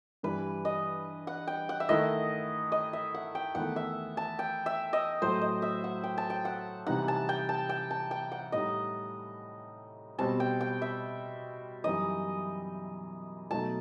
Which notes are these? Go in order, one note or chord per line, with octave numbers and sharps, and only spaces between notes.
G2 E3 G3 B4
D#5
F#5
G5
F#5
E5
D#3 A3 E4 D#5
D#5
E5
F#5
G5
E2 D#3 A3 E4 F#5
E5
A5
G5
E5
D#5
A2 F#3 A3 C5
D#5
E5
F#5
G5
A5
G5
F#5
C3 E3 G3 D#4 F#5
A5
G5
A5
G5
A5
G5
F#5
A2 G3 D#4 D#5
B2 G3 C4 A5
G5
G5
E5
F#2 E3 G3 D#4 D#5
B2 F#3 A3 D#4 A5